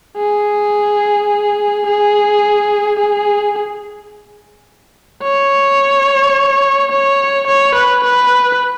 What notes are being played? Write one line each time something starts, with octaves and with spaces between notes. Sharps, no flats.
G#4
G#4
G#4
C#5
C#5
C#5
B4
B4